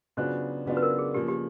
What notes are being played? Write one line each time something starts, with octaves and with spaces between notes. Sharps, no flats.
C#3 F#3 B3 D4 F4 C5
C#3 F#3 B3 D4 F4
B4
A#4
G#4
C#3 F3 A#3 G4
G4